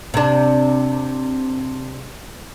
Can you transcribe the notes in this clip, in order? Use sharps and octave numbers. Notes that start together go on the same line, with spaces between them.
C3 D4